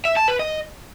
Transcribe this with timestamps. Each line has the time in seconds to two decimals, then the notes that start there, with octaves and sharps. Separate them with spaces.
0.05 E5
0.17 A5
0.28 B4
0.39 D#5